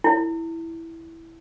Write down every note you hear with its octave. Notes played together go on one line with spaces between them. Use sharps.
E4